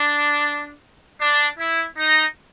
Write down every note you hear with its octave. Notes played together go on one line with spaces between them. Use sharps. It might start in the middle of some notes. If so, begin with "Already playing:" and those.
Already playing: D4
D4
E4
D#4